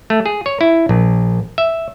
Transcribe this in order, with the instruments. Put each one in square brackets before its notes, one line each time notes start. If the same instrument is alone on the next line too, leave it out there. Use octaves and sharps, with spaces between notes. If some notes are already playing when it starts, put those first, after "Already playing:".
[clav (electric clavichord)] A3
G#4
C#5
E4
A#1
E5